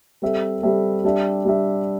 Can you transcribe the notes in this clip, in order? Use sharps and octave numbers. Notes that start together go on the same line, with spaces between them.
G3 C4 A4 E5
G3 C4 A4 E5
G3 D4 G4 E5
G3 D4 G4 E5